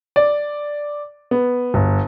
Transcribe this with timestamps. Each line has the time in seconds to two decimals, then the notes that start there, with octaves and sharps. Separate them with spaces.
0.16 D5
1.31 B3
1.74 G1